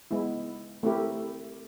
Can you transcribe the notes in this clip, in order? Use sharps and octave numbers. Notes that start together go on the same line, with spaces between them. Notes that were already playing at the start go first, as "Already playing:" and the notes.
G#3 B3 E4
A3 C4 E4 G4 A#4